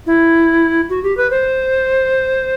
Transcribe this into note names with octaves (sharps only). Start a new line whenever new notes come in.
E4
F#4
G4
B4
C5